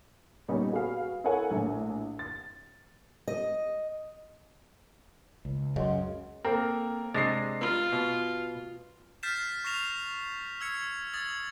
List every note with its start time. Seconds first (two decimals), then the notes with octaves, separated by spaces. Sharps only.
0.48 A#2 G3 B3 C#4 D#4
0.72 F#4 G#4 B4 F5
1.24 E4 A4 A#4 C#5 F#5 G#5
1.51 A#1 A2
2.19 A6
3.28 D#5
5.45 C#2
5.76 F#2 C#3 D#5 F#5 C6
6.45 A#3 C4 A4 A#4
7.14 C3 G#3 D4 A6 A#6 C7
7.61 F4
7.93 B2
9.23 F6 G6 A6 B6 C7 E7
9.64 C#6 F6 A#6 C7 E7 F7
10.61 E6 G#6 C#7
11.14 D#6 G#6 A6 F#7